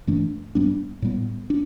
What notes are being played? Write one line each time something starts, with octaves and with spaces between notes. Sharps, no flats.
G2 E3 A3 D4
G2 G3 B3 D4
A2 G3 B3
D4